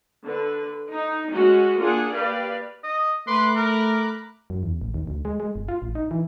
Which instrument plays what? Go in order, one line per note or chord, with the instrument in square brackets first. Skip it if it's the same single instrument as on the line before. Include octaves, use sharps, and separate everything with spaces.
[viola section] D3 B4
D#4
G#3 C#4 F#4
A#3 D4 F4 G#4 F#5
G4 B4 D5 F5
[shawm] D#5
[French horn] A3 [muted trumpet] B4 [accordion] B5 D6 F#6 [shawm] C6
[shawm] A#4 [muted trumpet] A#5
[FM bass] F#2
E2
A1
D#2
D2
G#3
G#3
G1
F4
A1
D#4
E3